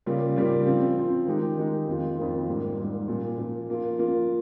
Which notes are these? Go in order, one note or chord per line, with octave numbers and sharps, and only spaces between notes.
C#3 G3 A#3 F4
C#3 G3 A#3 F4
F3 C4 F4
F3 C4 F4
D#3 G#3 D#4 G4
D#3 G#3 D#4 G4
F2 D#3 A#3 F4
F2 D#3 A#3 F4
G#2 G3 A#3
G#2 G3 A#3
A#2 F3 A#3
A#2 F3 A#3
F3 A#3 F4
F3 A#3 F4